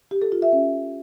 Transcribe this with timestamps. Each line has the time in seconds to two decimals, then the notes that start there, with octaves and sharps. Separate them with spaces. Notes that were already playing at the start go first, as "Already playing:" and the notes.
0.11 G4
0.22 A4
0.32 F4
0.42 E5
0.53 C#4